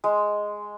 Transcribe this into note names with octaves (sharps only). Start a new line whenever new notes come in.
G#3